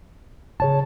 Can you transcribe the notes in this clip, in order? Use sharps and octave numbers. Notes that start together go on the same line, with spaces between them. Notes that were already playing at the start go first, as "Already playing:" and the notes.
C#3 G#4 C#5 A5